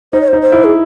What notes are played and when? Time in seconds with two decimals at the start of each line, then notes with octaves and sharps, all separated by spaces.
0.13 D#4 C5
0.21 C#5
0.28 C5
0.33 D#4
0.42 C5
0.52 E4
0.64 G#4